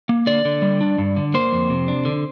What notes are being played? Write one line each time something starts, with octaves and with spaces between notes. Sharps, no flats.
A#3
D3 D5
D3
G3
D4
G2
D3
A#3 C5
F2
C3
D4
D3